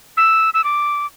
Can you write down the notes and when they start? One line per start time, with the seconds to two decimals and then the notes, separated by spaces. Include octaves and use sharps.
0.17 E6
0.54 E6
0.64 D6